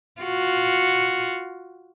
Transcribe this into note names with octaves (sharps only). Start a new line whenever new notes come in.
F4 F#4